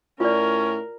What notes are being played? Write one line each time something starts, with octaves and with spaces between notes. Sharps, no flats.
A2 C#4 F4 A#4 D5